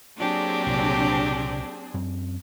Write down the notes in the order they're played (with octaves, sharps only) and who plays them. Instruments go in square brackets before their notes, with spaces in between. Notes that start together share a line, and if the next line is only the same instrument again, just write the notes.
[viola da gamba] F#3 A#3 G4 [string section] C4 D4 G#4
[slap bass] C2 A#2 C#3
F#2 C4